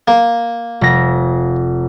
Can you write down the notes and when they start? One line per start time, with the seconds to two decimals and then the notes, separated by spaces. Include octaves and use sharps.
0.08 A#3
0.81 F1 A#6